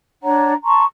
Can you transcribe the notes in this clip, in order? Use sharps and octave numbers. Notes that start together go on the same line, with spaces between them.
D4 C#5 F#5 A#5
A5 A#5 C6 C#6